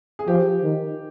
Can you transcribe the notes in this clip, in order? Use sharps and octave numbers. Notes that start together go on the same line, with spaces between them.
G#4
F3 G4
D#3